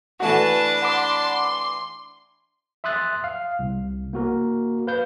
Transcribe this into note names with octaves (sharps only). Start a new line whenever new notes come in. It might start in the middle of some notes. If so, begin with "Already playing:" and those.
E3 A3 D4 F#4 B4 F#5 A5
F#5 B5 C6 D6
E5 C6 D#6 F#6 A6
F5
C2
A#3 F#4 A#4
B4 F5 G6